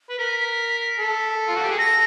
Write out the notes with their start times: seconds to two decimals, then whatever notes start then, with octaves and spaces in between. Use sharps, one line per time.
0.10 B4
0.18 A#4 B6
0.99 A4
1.48 F4
1.55 F#4
1.63 G4
1.71 G#4
1.78 A4 A#6